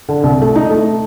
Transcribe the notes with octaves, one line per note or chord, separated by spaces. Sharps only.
D3
C2
A3
D#4
A3